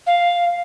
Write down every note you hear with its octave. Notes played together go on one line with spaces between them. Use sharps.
F5